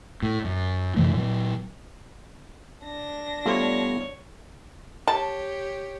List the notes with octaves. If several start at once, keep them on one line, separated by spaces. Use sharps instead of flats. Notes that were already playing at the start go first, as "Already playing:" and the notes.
A2
F#2
F#2 C3 E3 A3
A#2 F#3
D4 A#6
G3 A3 B3 F4 C#5
G4 C#5 A5